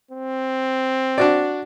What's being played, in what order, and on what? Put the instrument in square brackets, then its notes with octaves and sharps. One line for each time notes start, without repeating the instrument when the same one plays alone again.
[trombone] C4
[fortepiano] D4 F#4 D5